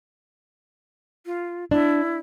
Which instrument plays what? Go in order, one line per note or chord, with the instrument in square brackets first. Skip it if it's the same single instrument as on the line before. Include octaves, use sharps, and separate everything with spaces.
[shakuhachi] F4
[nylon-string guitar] D4 [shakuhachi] E4